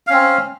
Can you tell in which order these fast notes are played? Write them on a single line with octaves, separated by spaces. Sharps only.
F5 C#4 C4